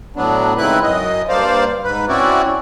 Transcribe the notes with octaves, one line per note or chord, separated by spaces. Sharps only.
A2 F#3 B3 D4
G#2 C#3 C4 E4 B4 F#6
F#2 D#5
G2 A#3 C5 D5 F5
G#2 B4
C4 C#4 E4 F#4 D5